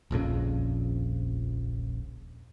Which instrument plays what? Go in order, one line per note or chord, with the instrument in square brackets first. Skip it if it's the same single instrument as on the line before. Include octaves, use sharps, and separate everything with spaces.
[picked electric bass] D#1 A#1 F2 C#3